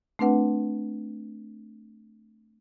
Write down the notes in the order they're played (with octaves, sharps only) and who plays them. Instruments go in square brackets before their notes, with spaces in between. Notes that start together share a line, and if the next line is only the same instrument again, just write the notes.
[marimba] A3 C4 D4 B4 F#5